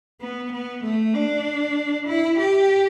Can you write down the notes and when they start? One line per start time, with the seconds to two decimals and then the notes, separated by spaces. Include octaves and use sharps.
0.21 B3
0.52 B3
0.84 A3
1.14 D4
2.08 E4
2.39 G4